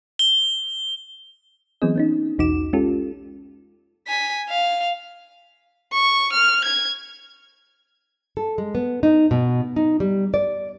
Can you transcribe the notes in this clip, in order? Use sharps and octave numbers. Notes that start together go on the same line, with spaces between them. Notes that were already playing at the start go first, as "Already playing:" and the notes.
G7
E3 F#3 B3 C4 G#4 D#5
B3 C#4 D#4
B1 E2 D#4 F#4 D6 E7
G#3 C#4 F4 G4 A4
G#5 B6
F5
C#6
F6
G#6
A4
G#3
B3
D#4
B2
D#4
G3
D5